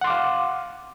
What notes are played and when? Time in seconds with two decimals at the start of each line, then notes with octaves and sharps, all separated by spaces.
0.01 F#5
0.04 C6
0.07 D6
0.10 F5